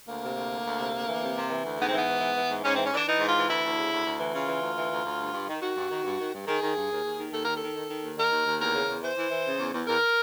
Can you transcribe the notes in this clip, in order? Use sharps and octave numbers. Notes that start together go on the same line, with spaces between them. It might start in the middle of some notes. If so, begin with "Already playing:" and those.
D2 A#3
C3
D2
D2
D2
C3
D2
E3
C3
C3
E3
D2
G#2 B3
C4
E3 B3
G#2
E3
E3
G#2
G#2 C#4
E3 C4
C#4
E3 D4
E3 D#4
G#2
F4
E3
D2 E4
D2
C#3
D2
D2
E3
C#3 F4
E3
D2
E3
D2
D2
G2
G2
D#3
D#3 F#4
G2
D#3
G2
D#3
G2
D#3 G#4
D#3
G2
D#2
D#2
D#3
D#2 A4
D#3 A#4
A4
D#3
D#3
D#3
D#2
D#3 A#4
D#2
D#2
E2 A#4
C#3
E2
E3 C5
E3
E3
C#3
E2
E2
E2 A#4